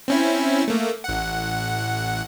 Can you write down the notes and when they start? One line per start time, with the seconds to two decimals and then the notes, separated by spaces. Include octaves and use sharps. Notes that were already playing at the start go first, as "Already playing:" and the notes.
0.08 C4 C#4 E4
0.68 A3 A#3
1.04 A1 F#5